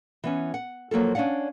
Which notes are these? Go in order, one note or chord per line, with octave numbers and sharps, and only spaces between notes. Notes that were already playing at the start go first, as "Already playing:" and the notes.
E3 B3 C#4
F#5
F3 F#3 A#3 F4 A4
C#4 D4 D5 F5 F#5